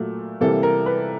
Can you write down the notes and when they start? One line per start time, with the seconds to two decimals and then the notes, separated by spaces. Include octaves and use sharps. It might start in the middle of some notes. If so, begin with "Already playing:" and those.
Already playing: A#2 F#3 A3
0.41 C3 E3 G3 A#3 A4
0.63 A#4
0.86 B4